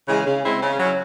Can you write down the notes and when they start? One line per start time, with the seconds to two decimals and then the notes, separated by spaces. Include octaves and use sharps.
0.08 C#3 E3 G#3
0.25 C#3
0.43 G#3 C4 E4 C5
0.61 C#3
0.79 F#3 C#4 E4